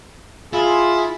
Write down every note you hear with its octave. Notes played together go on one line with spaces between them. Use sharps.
E4 F4 G#4